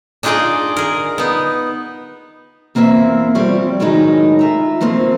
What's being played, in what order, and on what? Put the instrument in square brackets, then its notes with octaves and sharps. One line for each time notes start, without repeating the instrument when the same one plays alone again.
[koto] D4 D#4 F4 G#4 D5 D#5
G#4 A#4
B3 D#4
[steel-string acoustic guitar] E2 A#3 C4 E4 E5
F3 G3 C4 C#5
F#2 A2 D#3 F#3 G#3 D#4
F4 E5 A#5
F3 A3 A#3 C4